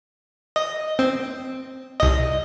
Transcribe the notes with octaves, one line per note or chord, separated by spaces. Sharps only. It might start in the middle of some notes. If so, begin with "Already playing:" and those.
D#5
C4
C2 D#5